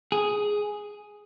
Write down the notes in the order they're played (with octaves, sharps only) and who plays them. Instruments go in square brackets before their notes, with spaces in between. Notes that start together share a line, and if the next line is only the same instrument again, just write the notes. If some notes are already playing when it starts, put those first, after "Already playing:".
[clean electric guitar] G#4